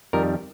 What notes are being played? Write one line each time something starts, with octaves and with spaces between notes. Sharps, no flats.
F2 D#3 G3 A#4